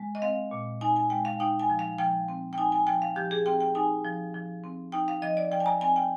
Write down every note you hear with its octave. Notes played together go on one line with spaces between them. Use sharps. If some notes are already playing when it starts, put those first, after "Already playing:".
Already playing: G#3
D#5
C4 F5
A#2
D#4 G#5
G#5
G#3 G5
F5
D#4 G5
G#5
F3
F5
F3 G5
C4
G5
D#4 G#5
G#5
F3 G5
F5
F3 G4
G#4
C4 G5
G5
D#4 G#5
F3
F3
C4
D#4 G5
F5
F3 D#5
D5
F3 G5
G#5
A#5
C4 G#5
G5